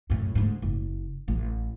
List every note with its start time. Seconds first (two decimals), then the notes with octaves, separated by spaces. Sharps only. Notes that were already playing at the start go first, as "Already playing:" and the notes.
0.10 F#2 A2
0.35 D2 G#2
0.62 F#1
1.28 A1